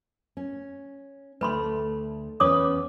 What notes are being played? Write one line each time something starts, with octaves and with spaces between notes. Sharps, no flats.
C#4
D2 A3 B4 B5 C6
E2 C#4 B4 C#5 D6 D#6